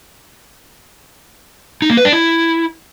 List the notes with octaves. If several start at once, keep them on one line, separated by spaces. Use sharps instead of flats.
D#4
A#3
B4
D4
E4